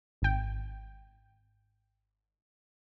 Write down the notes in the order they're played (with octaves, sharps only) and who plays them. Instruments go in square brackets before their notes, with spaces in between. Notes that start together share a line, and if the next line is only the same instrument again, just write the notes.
[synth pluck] G#1 G5